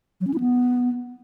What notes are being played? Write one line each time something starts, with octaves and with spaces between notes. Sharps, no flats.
F#3
C#4
E4
B3